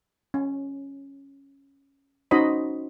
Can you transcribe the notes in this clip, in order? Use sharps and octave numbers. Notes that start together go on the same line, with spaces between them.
C#4
C#4 D#4 F#4 C5 D#5 B5